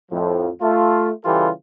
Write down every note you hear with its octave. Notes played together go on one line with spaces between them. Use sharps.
F2 A2 F3
A3 F4
C#3 E3 G3 F4 G4 A4